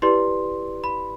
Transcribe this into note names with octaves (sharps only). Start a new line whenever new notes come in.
E4 G4 B4 D5 C6
B5